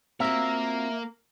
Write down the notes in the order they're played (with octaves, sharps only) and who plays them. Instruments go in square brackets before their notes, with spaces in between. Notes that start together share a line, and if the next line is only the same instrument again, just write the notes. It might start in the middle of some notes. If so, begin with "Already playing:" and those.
[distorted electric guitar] A#3 A#4 [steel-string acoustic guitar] C4 F4 F#4 [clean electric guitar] E5